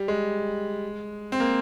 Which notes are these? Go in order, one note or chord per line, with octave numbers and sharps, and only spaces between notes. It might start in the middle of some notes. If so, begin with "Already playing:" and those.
Already playing: G3
G#3
C4
A#3